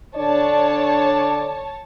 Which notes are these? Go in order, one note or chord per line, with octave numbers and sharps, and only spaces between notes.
D3 D4 C#5 D5 A5